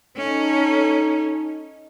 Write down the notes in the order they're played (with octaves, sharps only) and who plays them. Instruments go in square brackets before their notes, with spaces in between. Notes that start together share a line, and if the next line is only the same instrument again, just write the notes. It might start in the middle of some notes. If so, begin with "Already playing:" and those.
[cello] C#4 [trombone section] D#4 A4